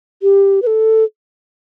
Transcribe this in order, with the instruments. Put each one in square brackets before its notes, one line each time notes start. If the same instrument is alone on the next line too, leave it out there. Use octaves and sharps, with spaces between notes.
[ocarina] G4
B4
A4